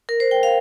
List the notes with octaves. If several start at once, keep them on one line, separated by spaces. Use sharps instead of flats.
A#4
C5
G5
F5